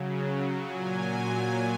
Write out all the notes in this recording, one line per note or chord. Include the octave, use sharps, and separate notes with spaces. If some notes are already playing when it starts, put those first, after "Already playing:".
Already playing: C#3 F#3
A#2 F#3 G#5